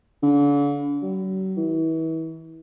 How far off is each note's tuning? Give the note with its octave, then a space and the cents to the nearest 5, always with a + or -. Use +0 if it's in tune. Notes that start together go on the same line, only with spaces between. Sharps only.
D3 -40
F#3 +40
E3 -35